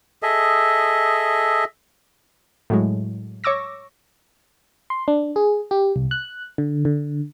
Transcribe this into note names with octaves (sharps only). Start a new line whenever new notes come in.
G#4 A4 D#5 E5
A2 F#3 G#3
C#5 C#6 D6 E6 A#6
C6
D4
G#4
G4
C2
F#6
D3
D3